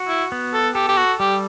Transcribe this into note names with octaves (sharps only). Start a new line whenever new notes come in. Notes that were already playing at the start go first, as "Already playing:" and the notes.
Already playing: F#4
E4
B3
A4
G4 A4
G4
F#4
G3 G4